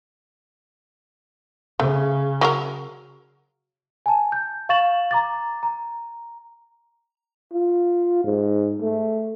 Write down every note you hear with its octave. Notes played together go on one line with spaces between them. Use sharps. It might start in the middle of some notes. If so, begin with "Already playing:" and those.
C#3 A3
F#3 G4 A#4
G#5 A5
G6
F5 C#6 A6 E7 F#7
A#5 D6 A6
A#5
F4
G#2
A3